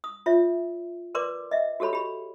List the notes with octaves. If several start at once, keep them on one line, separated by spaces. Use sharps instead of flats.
D#6
F4 C#5 E5
A#4 B4 D5 C6 D6
D#5 E5
F#4 G4 A4 C#5 B5
G4 B5